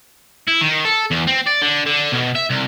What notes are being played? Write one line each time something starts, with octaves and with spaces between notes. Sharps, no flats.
E4
D#3
A4
E2
C4
D5
D3
D3
B2
E5
C2